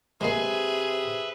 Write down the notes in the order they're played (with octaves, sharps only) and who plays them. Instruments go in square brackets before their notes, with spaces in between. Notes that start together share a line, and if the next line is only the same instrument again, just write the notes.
[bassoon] C3 [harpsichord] G#3 A#3 [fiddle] G#4 [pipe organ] B4 E5